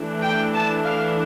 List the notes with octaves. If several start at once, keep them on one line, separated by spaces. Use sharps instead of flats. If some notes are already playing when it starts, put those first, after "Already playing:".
Already playing: E3 A3 D4
G5
A5
F5